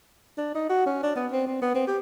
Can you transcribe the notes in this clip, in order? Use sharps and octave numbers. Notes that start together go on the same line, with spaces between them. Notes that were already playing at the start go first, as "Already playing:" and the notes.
D4
D#4
F#4
C#4
D4
B3
C4
C4
B3
C4
G4